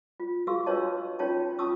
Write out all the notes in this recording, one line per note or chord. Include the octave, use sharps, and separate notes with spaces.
F4
F#4 G#4 F5 C#6 E6
D4 B4 C#5 D#5 A5
C#4 D#4 F4 C#5 G5 A5
C#4 F4 A5 C#6 D#6 E6